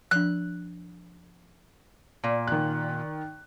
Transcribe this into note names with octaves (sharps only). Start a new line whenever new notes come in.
F3 D4 F#6
A#2
D#3 F#6